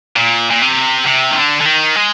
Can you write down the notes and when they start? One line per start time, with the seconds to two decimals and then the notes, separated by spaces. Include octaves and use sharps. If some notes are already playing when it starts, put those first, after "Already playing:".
0.16 A#2
0.50 A#2
0.61 C3
1.06 C3
1.31 D#3
1.36 D3
1.61 D3
1.66 D#3
1.96 G#3